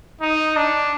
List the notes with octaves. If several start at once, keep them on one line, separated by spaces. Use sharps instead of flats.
D#4
D4